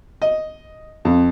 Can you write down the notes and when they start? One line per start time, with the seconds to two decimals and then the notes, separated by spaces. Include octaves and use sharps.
0.22 D#5
1.05 F2